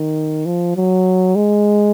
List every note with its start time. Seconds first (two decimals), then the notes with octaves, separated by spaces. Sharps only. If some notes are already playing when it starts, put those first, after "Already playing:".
Already playing: D#3
0.46 F3
0.76 F#3
1.36 G#3